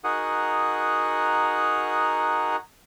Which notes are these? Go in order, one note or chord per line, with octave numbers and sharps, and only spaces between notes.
D#4 F#4 G#4 A#4 F#5 D#6